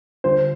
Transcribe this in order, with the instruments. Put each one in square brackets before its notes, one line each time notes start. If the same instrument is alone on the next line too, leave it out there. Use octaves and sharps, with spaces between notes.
[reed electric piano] D3 G3 D4 F4 [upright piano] C5